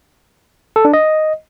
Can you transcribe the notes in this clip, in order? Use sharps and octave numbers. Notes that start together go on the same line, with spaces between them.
A4
D4
D#5